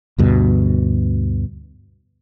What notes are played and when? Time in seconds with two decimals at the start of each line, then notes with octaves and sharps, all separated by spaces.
0.18 D2 G2 B2